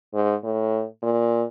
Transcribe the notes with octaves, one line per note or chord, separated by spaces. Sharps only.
G#2
A2
A#2